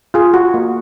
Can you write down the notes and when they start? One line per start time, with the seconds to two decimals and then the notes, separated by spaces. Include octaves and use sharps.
0.14 F4 G#4
0.34 F#4
0.54 A#3